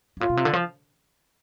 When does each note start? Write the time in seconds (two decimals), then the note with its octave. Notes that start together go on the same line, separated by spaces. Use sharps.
0.17 G#2
0.21 A2 F4
0.29 B2
0.37 C3
0.45 D3
0.53 F3